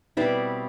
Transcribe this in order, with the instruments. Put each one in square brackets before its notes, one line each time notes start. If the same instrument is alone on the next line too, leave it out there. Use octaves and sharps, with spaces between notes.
[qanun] B2 G3 C4 E4 B4 D5